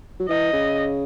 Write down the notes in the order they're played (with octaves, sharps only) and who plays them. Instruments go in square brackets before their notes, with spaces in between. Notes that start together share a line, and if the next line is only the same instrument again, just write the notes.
[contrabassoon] F#3
[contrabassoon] E3 [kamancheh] D#5
[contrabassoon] C#3